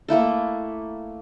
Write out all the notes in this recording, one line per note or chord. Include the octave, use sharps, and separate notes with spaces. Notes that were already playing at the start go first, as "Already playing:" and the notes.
A3 A#3 E4 A4